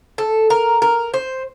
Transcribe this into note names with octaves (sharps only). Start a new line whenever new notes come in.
A4
A#4
A#4
C5